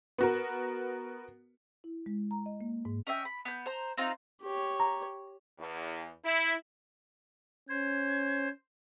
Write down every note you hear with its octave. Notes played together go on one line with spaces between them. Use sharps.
B3 F#4 A#4
E4
G#3
A#5
D#5
A#3
G#2
C#4 D#5 E5 G5
B5
B3 G6
C5 A#5
C4 D#4 F4
G4 C#5
A#5
E2
E4
C#4 C5 G#6